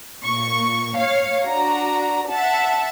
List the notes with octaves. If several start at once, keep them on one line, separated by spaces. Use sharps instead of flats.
A#2 C#6
C#5 F5
D4 F#4 A#5
E5 F#5 A5